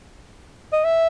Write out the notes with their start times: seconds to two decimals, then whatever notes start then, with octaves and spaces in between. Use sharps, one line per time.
0.73 D#5
0.84 E5